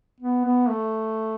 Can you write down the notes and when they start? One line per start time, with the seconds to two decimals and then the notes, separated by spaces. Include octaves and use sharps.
0.20 B3
0.45 B3
0.69 A3